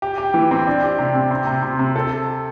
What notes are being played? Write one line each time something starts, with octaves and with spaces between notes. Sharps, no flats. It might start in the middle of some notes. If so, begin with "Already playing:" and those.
G4
G4
E3
C4
D4
G4
C3
C3
C4
C3
C3
C3
A4